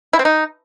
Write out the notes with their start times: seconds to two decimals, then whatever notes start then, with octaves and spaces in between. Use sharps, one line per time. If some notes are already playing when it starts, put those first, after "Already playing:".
0.13 E4
0.19 C4
0.25 D#4